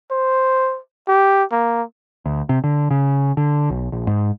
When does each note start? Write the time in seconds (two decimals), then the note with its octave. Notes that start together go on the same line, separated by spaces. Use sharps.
0.11 C5
1.08 G4
1.52 A#3
2.26 D2
2.49 C3
2.64 D3
2.91 C#3
3.37 D3
3.70 B1
3.92 A#1
4.07 G#2